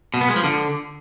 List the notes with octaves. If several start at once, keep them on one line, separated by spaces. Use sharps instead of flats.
B2
B3
G#3
F3
D3